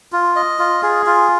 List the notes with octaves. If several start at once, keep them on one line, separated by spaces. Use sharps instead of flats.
F4
D#5
F4
G#4
F4